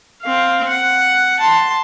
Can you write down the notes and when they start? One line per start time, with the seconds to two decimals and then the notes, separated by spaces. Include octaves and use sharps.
0.22 C4 F5
0.68 F#5
1.40 A5 C6